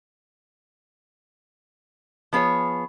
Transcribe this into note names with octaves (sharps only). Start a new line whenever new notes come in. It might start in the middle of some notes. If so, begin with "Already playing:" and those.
F3 B3 G#4 C5 C#5